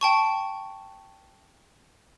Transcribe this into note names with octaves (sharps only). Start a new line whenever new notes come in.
G5 A5 C#6